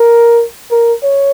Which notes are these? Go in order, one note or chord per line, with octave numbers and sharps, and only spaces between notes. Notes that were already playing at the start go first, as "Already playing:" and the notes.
Already playing: A#4
A#4
C#5